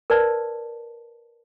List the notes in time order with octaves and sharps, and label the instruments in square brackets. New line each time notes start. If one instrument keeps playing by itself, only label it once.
[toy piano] A#4 B4 D5 A5